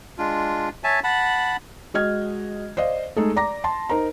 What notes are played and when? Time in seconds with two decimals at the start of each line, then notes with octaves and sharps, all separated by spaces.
0.18 G#3 D4 F4
0.84 C#5 E5 G#5 A5
1.04 F#5 A5 B5
1.94 G#3 F#4 D#5 F6 G#6
2.77 C5 D5 D#5 F5
3.16 G#3 A3 D#4 G#4 A4
3.36 D5 A#5 D6 A#6
3.64 A5 C6
3.89 D#4 A#4 C5 A#5